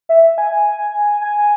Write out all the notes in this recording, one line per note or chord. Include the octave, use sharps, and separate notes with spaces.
E5
G#5
G#5